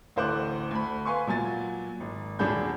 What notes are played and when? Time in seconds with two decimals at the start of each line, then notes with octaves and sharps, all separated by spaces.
0.16 A1 D2 D3 C5 D6 F#6
0.71 D2 B5
1.05 B4 F5 G#5 C6 C#6
1.27 A#2 F#3 G#5 A6
2.00 G#1
2.39 D#1 F#3 D4 G#4 B5 G6